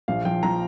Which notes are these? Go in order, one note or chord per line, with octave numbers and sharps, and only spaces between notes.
A#1 F5
F3 G5
F3 A#5